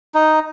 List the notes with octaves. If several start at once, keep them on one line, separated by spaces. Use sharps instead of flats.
D#4